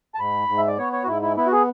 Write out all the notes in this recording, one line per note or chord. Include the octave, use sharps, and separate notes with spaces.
A5
G#2 B5
G#2
E5
D5
B3 C#5
C#5
F#4
G#2 E4
E4
B3 E4
F#4
G#4